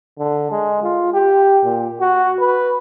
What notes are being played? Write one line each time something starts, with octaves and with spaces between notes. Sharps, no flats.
D3
G#3
F4
G4
A#2
F#4
B4